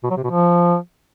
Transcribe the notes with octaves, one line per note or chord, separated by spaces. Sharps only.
B2
F#3
C3
B2
F3